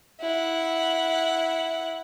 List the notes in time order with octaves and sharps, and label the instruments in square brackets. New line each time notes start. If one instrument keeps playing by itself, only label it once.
[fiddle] E4 F#5